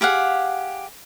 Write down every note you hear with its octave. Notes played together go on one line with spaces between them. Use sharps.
G4 G#4 F5 F#5